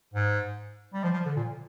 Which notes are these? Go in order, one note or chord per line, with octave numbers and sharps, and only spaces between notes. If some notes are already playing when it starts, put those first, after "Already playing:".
G#2
G3
F3
F3
D3
A#2